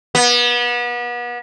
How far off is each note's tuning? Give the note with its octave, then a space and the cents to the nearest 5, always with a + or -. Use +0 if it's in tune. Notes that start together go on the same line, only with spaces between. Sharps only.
B3 -35